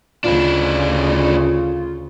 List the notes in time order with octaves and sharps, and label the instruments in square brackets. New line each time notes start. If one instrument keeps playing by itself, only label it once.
[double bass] D2 C#3 [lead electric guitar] D4 E4 [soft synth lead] F4